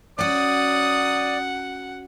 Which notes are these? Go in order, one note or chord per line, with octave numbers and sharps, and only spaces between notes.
F#3 C#4 F#4 D5 F#5 D#6